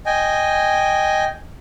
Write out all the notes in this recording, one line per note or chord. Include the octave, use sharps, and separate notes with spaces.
D#5 G5 G#5